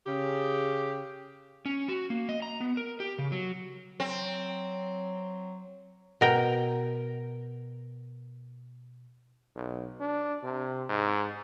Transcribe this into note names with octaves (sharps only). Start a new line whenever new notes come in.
C#3 G4
C#4
F#4
A#3
D#5
A#5
B3
A#4
G4
C#3
F#3
F#3 C4
B2 A#4 G5
B1
D4
C3
G#2